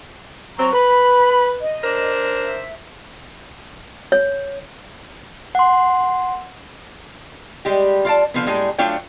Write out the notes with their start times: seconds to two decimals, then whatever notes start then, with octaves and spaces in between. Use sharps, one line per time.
0.58 F#3 C4 A#5 C#6
0.73 B4 B5
1.61 D#5
1.84 D4 A#4 C5
2.44 E5
4.12 C#5
5.55 F#5 C6
7.65 G3 G#3 G4
8.05 F4 D5 A5
8.34 D3 F3 B3
8.46 A2 G3 G#3 G#4
8.78 F#3 A3 D4 F4 C#5 G5